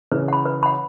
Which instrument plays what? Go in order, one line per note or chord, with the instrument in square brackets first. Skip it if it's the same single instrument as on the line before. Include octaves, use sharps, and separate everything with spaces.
[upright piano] C#3 E3 [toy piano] B4
[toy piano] F#5 B5
B4
F#5 B5